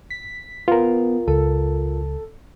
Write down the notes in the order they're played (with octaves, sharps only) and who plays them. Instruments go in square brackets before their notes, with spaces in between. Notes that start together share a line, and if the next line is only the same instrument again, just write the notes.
[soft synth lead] B6
[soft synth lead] B3 [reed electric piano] F4 A#4
[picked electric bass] C#2 [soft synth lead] A4